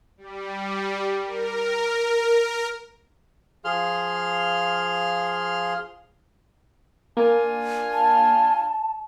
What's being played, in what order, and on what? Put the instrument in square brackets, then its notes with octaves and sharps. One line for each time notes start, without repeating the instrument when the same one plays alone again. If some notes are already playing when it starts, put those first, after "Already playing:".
[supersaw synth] G3
A#4
[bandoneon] F3 G#4 F5 C6 F6
[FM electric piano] A#3 [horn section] D4 F4 G#5
[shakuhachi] A5